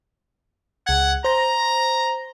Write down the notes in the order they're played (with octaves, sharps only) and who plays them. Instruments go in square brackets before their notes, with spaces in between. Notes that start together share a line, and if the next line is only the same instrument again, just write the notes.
[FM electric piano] C#2 G#6 [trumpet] F#5
[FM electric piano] C5 A#6 [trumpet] A#5